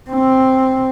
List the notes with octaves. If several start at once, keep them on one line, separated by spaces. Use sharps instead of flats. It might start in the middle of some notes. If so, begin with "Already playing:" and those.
C4